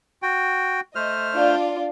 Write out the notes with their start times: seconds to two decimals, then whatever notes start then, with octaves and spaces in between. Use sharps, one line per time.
0.22 F#4 G5
0.95 A3 C5 D#5 F6
1.33 D4 F4 D5